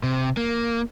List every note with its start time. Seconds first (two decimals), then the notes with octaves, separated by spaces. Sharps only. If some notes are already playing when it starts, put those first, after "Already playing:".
0.03 C3
0.37 A#3